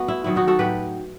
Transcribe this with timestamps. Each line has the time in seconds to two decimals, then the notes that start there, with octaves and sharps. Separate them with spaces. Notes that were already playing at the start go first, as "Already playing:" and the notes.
Already playing: A3 B3 F#4
0.08 E4
0.24 D#3 F#3 B3 E4
0.36 D#4 F#4
0.47 F#4 A4
0.59 A2 F#3 G4 B4